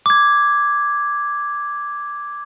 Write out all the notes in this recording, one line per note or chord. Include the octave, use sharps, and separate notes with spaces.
D6 G#6